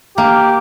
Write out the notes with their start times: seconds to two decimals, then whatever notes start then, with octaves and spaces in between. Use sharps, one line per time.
0.17 A#3 G4